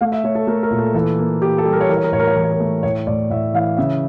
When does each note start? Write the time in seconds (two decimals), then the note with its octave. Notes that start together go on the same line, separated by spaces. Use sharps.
0.01 A3 F5
0.12 E5
0.24 A3 C#5
0.35 A4
0.47 A3 A#4
0.63 A#4
0.71 A#2
0.78 A4
0.94 E3 A4
1.19 A#3
1.42 A#3 G4
1.58 A4
1.66 G3
1.73 A#4
1.81 C#5
1.89 E3 A#4
1.97 C#5
2.04 A#4
2.12 A2 C#5
2.20 A#4
2.27 C#5
2.36 E3 A#4
2.44 C#5
2.52 A#4
2.60 A3
2.83 A2 C#5
3.07 A2 D5
3.30 A2 E5
3.54 E3 F5
3.77 C#3 E5